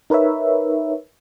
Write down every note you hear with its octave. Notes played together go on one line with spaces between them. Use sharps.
D#4 A#4 B4 C#5 E5